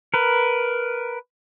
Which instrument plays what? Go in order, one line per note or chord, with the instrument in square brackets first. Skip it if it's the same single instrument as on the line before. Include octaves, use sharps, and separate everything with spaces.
[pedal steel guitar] A#4 B4